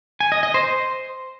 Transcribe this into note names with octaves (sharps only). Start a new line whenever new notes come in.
G#5
D#5
D#5
C5